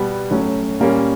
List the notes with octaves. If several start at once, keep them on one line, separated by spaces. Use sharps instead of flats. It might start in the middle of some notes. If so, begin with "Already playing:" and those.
Already playing: B2 G3 B3
A2 F#3 A3 C#4
A#2 G3 A#3 C#4